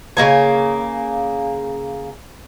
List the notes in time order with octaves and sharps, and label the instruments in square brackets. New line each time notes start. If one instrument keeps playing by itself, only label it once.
[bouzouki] C#3 G#3 A#3 G#5